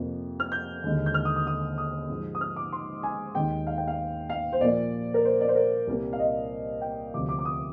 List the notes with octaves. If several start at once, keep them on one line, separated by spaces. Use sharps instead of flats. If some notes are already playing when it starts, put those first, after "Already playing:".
Already playing: F2 C3 F3 A#3
F6
G6
D#2 D3 G#3
G6
F6
D#6
D#6
D#6
D#6
G#2 F3 G#3
D#6
F6
D6
C6
G#5
D#2 D#3 G#3 G5
F5
G5
F5
F5
C5
A#2 F3 A#3 D5
A#4
C5
D5
C5
A#4
C2 A#2 G3 A#3
F5
D#5
G5
D2 C3 F3 D6
D6
D6
D#6